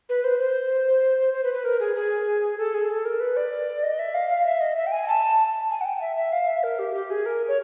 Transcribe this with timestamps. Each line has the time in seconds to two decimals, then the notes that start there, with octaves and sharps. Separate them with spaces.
0.09 B4
0.24 C5
0.40 C5
1.34 C5
1.44 B4
1.54 B4
1.64 A#4
1.80 G#4
1.96 G#4
2.58 A4
2.74 G#4
2.89 A4
3.05 A#4
3.20 B4
3.37 D5
3.83 D#5
3.99 E5
4.14 F5
4.29 F5
4.45 E5
4.60 D#5
4.76 E5
4.87 G5
4.92 G#5
5.08 A5
5.70 G#5
5.81 F#5
5.85 G5
6.01 E5
6.16 E5
6.32 F5
6.47 E5
6.63 A#4
6.79 G4
6.94 G4
7.10 G#4
7.26 A#4
7.48 C#5